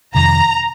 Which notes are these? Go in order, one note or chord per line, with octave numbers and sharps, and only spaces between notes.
F2 C3 D#3 A#5